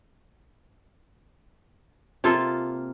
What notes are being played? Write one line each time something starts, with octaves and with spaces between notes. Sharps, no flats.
C3 A#3 F4 A4